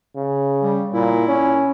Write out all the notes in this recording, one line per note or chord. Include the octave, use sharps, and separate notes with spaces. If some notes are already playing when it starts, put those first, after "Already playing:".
C#3
G3
A#2 E4
C#4